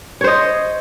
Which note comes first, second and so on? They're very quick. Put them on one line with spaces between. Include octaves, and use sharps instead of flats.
C#5 C5 D#5